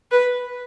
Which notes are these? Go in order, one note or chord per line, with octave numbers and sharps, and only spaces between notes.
B4